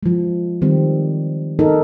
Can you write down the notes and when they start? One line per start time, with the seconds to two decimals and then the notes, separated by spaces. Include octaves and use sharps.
0.03 F3 G#3
0.62 D#3 G3 G#3 C4
1.59 B3 D#4 A4 A#4